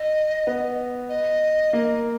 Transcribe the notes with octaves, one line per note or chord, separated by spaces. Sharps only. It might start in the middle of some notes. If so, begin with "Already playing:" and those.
Already playing: D#5
B3
D#5
A#3